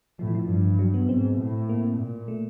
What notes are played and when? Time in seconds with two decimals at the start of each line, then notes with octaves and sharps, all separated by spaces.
0.19 A2 F3
0.28 E3
0.35 F3
0.49 G2
0.79 F#3
0.94 B3
1.09 G#2 C4
1.39 A2
1.69 A#3
1.99 A#2
2.28 A3